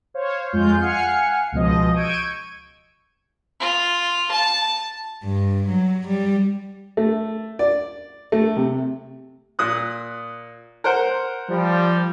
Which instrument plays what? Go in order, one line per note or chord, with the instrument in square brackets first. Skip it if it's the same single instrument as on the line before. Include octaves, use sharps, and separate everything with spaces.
[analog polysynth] C5 C#5 F5
F2 G#3 F4 G6
F5 F#5 G#5 F6 C7 C#7
C#2 B2 F3 D#5
C#6 E6 G6 G#6 D7 D#7
[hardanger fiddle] F4
A5
[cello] G2
F#3
G3
[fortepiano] A3
D5
A3
C3
A#2 D#6 F#6
A#4 C5 F#5
[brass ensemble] F3 G3